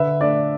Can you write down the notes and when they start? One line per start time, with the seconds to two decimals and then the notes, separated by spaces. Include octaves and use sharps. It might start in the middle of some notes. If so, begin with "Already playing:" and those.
Already playing: D3 B4 E5
0.20 A3 D4 D5